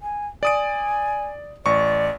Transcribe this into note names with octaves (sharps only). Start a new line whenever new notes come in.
G#5
D5 G#5 D#6 D7
A1 D5 C#6